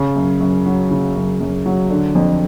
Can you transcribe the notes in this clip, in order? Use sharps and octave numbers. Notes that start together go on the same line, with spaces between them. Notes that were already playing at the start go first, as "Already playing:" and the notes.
Already playing: C#3
F#2
F#2
F#3
C#3
F#2
F#2
F#3
D3
F2